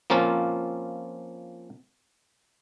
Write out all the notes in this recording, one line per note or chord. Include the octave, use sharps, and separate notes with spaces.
F3 A#3 C4 C#4 F4